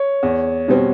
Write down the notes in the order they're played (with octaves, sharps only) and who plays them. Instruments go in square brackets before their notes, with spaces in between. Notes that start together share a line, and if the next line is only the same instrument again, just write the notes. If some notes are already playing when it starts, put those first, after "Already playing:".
Already playing: [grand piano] C#5
[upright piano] E2
B2 G3 C4